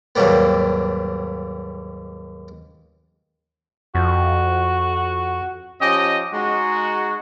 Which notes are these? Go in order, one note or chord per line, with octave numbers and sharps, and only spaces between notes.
D#2 G#2 F#3 G3 A#3 B3
F2 F#4
F3 C#4 G4 D#5
G#3 D#4 F#4